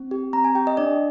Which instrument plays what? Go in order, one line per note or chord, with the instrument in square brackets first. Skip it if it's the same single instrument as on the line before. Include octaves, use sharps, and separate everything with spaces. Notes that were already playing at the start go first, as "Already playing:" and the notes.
Already playing: [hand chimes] C4
G4
C4 A#5
G#5
G4 G5
D#5
D4 D5